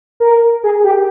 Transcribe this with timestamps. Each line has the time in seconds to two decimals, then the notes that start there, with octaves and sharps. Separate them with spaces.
0.20 A#4
0.64 G#4
0.84 G4